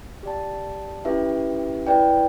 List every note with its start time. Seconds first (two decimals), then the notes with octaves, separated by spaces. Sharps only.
0.23 G4 D5 A5
1.05 C#4 E4 G4 B4 E5
1.87 E4 B4 D5 G5